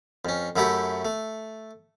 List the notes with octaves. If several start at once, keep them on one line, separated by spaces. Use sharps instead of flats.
F2 C#4
F#2 F#3 A3 E4 G4 C#5
A3